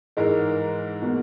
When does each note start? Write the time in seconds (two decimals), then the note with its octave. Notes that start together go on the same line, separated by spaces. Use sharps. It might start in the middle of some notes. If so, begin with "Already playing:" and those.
0.17 G#2 E3 G#3 A#4
1.02 B2 A#3